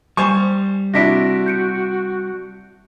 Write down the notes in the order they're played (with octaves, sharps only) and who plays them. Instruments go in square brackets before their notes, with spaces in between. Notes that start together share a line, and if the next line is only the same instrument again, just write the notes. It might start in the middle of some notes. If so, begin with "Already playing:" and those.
[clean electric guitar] G3 [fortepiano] C5 G#5 C#6
[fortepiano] C3 D4 E4 [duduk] F#4 [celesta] A#6 B6 D7
[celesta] G6 C#7 D7